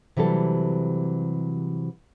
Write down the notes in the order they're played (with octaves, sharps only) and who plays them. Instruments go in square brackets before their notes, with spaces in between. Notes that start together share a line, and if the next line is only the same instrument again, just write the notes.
[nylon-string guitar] C3 E3 F#3 G3 A4